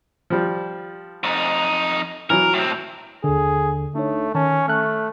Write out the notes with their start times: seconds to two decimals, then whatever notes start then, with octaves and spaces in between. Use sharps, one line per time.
0.30 F3 G3
1.24 F2 D#4
2.30 E3 F#3 A#4
2.54 A2 C4
3.24 D#2 D3 G#4
3.95 A3 D4 D#4 C#5
4.35 D#3 C#4 A5
4.68 A3 F6 F#6